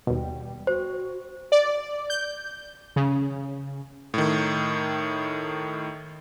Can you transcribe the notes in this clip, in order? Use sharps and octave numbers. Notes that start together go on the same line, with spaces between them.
D#2 B2 G3
F#4 C5
D5
G6
C#3
A2 D#3